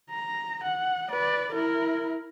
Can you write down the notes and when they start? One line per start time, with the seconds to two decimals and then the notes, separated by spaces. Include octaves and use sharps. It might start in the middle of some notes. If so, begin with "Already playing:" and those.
0.10 A#5
0.63 F#5
1.11 B4 D5
1.52 E4 A#4